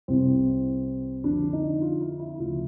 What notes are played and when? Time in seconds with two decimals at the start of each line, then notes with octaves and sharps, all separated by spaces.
0.08 C2 C3 E3 C4
1.24 F2 D3 F3 D4
1.53 D#4
1.82 F4
2.01 E4
2.20 E4
2.40 D2 C#3 F3 F4